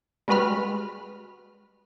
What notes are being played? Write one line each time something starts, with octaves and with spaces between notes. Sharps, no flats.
G3 G#3 F#4 B4 B5 F6